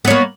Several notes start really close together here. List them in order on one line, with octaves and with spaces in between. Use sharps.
B3 C#5 A#3